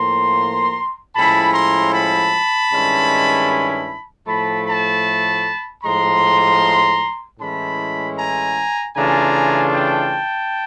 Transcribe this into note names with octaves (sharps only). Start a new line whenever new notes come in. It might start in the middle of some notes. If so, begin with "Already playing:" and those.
Already playing: A2 F3 A#3 A#5 C6
A2 F3 G#3 C#4 E4 A5 B5
A#5 C6
A5 B5
G2 D#3 G#3 C#4 E4
A2 F3 A3 A5 B5
A5 B5
A2 F3 G#3 A#5 C6
A2 E3 G#3 C#4 E4 A5 B5
G#5 A#5
C#3 E3 A3 D4 F4 G#5 A#5
G5 A5